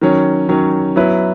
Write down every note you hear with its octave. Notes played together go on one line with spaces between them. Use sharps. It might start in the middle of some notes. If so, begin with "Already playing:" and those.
D#3 F#3 C#4
D#3 F#3 C#4
F#3 B3 E4 B4